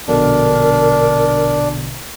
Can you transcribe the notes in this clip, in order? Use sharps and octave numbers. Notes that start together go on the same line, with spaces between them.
A#1 B2 D3 D4 A#4